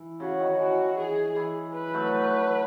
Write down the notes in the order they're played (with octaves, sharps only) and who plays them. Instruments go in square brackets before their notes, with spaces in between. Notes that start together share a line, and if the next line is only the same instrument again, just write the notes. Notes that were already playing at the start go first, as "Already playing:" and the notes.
Already playing: [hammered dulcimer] E3
[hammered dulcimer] C#3 [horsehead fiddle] F#4
[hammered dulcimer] D#3
[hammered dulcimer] E3 [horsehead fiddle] F#4
[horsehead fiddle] G#4
[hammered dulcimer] E3
[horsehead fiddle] B4
[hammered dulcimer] F#3 A3